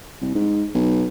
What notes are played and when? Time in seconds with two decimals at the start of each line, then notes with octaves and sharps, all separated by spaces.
0.22 C2
0.35 G#2
0.75 B1